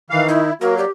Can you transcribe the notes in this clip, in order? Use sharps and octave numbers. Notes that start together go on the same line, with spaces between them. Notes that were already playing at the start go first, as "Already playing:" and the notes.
D#3 E3 F5
D#4 E4
F#3 A#3 F#4 A#4
G4 D5